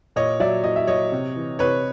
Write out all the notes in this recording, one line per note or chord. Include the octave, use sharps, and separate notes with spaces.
A#2 C#5 D#5
F#3 D5 E5
A#2 D#5
E5
F#3 C#5 D#5
C3
E3
C3 B4 C#5